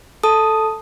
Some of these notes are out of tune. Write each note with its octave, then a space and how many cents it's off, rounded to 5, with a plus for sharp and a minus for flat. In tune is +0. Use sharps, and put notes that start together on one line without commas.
A4 +0 A5 +0 D#6 +0